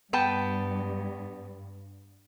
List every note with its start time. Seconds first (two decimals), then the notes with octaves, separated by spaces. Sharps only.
0.13 G2 B3 G5 A5